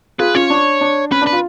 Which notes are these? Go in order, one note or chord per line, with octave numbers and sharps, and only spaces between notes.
F4 G#4 B4
C#4 F4 C#5
D4
D4
C#4 B4
D4 B4
F4